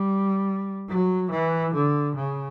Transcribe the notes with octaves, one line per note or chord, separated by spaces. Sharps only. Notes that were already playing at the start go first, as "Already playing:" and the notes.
Already playing: G3
F#3
E3
D3
C#3